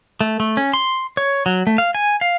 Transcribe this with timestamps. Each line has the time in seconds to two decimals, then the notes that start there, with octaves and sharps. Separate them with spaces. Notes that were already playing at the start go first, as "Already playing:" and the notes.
0.21 A3
0.40 A3
0.57 C#4
0.74 C6
1.17 C#5
1.46 F#3
1.67 A3
1.78 F5
1.95 G#5
2.21 F5